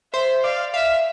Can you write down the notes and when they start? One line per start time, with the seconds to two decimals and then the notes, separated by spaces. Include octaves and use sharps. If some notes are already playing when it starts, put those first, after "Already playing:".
0.13 C5 E5
0.43 D5 F5
0.74 E5 F5